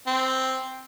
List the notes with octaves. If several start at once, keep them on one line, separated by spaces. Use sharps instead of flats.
C4